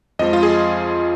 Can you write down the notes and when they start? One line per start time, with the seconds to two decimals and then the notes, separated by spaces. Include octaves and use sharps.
0.19 F2 F3 G#3 D#5
0.33 F4
0.43 G#4